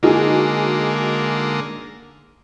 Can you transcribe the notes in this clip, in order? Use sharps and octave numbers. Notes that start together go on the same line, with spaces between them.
D3 G#3 A#3 D#4 F#4 G#4